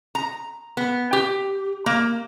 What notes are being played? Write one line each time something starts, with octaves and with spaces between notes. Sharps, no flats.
A#5
B3
G4
A#3